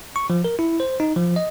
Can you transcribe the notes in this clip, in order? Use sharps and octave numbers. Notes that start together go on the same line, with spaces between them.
C#6
F3
A#4
E4
C5
D#4
F3
D#5